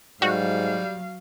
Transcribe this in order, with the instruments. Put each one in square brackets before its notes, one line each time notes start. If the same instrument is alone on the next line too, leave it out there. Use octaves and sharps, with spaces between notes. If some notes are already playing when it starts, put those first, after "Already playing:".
[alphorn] G#2 [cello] F#3 F5 [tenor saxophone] G3 [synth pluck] F#4